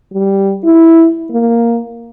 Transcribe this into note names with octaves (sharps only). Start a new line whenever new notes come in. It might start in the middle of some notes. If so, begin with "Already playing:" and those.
G3
E4
A#3